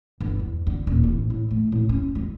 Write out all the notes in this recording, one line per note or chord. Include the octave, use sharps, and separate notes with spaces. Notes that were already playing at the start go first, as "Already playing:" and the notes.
G1
E2
D3
D#1
A1
A2
A3
A2
C#4
G#3